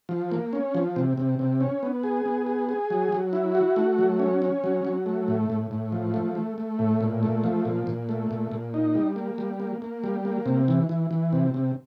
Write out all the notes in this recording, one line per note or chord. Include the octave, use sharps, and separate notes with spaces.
F3
A#3
C#4
F3
C3
C3
C3
C#4
B3
G#4
B3
G#4
G#4
F#3
F#3
E4
F#4
A3
F#3
C#4
C#4
F#3
F#3
A3
A2
A2
A2
F3
A3
A3
A3
A2
A#2
A3
F3
A#2
A#2
A3
A#2
A#2
D#4
G3
A#3
G3
A#3
A#3
G3
A#3
C3
E3
E3
E3
C3
C3